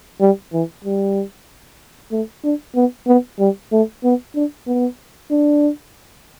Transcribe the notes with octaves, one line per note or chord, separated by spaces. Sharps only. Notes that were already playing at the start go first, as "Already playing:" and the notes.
G3
E3
G3
A3
D4
B3
B3
G3
A3
B3
D4
B3
D4